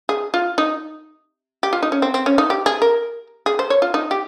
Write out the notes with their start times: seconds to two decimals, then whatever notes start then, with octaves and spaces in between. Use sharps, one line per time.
0.09 G#4
0.34 F4
0.58 D#4
1.63 G4
1.73 F4
1.83 D#4
1.92 C#4
2.02 C4
2.14 C4
2.26 C#4
2.38 D#4
2.50 G4
2.66 G#4
2.82 A#4
3.46 G#4
3.59 C5
3.70 C#5
3.82 F4
3.94 D#4
4.11 G4